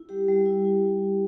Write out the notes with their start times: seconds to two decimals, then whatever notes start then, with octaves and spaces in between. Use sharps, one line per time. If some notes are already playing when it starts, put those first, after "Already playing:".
Already playing: E4
0.09 G3 G4
0.28 G3
0.46 E4
0.65 E4